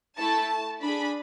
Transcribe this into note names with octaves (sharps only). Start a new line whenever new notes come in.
A3 E4 A4 A5
D4 G#4 B5